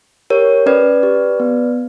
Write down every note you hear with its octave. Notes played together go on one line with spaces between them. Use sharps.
G4 A#4 C#5
C#4 B4 D5
G4
B3